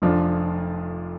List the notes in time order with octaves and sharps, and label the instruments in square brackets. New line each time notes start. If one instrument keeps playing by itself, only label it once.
[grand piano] F1 F2 F3 D4 F4